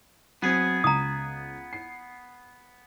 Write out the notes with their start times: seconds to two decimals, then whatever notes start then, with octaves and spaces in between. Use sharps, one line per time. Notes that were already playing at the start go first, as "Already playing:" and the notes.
0.42 F#3 B3 C4 G#4
0.84 C#2 A#5 D#6
1.73 C7